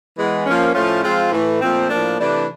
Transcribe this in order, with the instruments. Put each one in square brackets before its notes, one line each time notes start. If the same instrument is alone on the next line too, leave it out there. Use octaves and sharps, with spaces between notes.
[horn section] E3 G#3 B3
F3 A#3 C#4
A2 F3 A3 C#4 F4
F3 G#3 C4 F4
A2 E3 A3
A#2 F3 A3 C4
A2 F3 A#3 D4
C3 E3 A3 D4